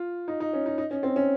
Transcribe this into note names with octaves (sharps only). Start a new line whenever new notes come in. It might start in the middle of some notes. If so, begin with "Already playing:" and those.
Already playing: F4
D#4
D#4
C#4
D#4
D#4
C#4
C4
C#4